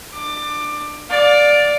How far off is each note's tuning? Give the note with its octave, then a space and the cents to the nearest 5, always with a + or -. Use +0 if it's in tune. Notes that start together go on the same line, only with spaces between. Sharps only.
D4 +25 D6 +20
D5 +0 F5 +30